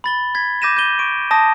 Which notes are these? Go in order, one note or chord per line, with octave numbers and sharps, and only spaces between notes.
B5 A6 G7
G#6 B6
D6 G6 A#6 D#7 E7
G6 A#6 D#7 G7
C#6 D7
A5 D#6 A#6